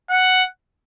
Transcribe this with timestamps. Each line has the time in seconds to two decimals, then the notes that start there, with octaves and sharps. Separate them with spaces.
0.10 F#5